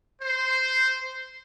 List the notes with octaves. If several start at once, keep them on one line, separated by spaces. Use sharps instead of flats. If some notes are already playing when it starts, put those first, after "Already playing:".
C5